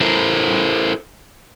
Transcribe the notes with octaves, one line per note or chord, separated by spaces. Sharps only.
E4 A4 A#4 C5